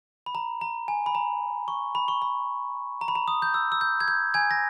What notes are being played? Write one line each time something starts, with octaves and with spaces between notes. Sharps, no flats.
B5
A#5
A#5
G#5
B5
A#5
C#6
B5
C#6
B5
A#5
B5
A#5
D#6
G6
E6
E6
G6
G#6
G6
G#5 G#6
A#6